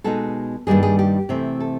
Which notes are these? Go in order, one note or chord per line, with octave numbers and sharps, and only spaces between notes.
B2 G#3 B3 D#4 A4
G2 D#3 G3 A#3 G#4
G#4
G4
C3 E3 A3 C4
A4